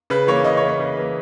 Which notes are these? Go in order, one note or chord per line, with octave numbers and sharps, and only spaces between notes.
C#3 B4
E3 A#3 C#5
C#3 D#5
C#5
E3 A#3
C#5
C#3
E3 A#3